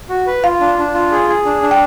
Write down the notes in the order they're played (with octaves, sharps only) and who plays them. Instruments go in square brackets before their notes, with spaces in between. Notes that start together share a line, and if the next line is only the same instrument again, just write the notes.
[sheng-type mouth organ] F#4
B4
[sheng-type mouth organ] F4 [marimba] F5
[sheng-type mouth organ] D4
D4
F4
G#4
G#4
D4
D4
[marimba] G5